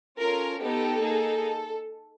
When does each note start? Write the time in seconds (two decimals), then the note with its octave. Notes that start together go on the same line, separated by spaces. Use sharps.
0.19 C#4 F4 A4 A#4
0.60 B3 D#4 G4 A4
1.02 A#3 D#4 G#4